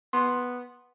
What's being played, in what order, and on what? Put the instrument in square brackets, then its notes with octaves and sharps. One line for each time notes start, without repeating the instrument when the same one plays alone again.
[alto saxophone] B3 [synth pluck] C6